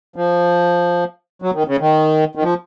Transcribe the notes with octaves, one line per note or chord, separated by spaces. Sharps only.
F3
F#3
D#3
C#3
D#3
D#3
F3